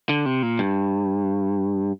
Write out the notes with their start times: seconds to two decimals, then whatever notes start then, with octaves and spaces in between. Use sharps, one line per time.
0.09 D3
0.26 C3
0.43 A#2
0.59 G2